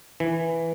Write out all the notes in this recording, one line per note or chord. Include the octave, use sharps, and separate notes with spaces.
E3